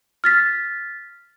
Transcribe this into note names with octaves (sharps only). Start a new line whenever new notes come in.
F6 A6 B6